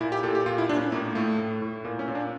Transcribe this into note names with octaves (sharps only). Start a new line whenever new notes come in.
A#2 E4
G4
A#2 A4
G4
A#2 F4
E4
A#2 D4
C#4
D4
A2 A#3
A2 A3
A2
A2
A#2 A#3
C#4
A#2
D4